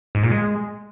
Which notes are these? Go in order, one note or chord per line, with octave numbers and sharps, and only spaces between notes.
G#2
A#2
G#3